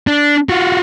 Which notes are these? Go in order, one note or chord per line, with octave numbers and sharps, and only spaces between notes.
D4
F4 F#4